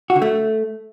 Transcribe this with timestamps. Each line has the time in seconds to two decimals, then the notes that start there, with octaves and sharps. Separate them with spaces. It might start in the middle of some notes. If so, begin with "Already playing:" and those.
0.10 F#4
0.16 D3
0.22 A3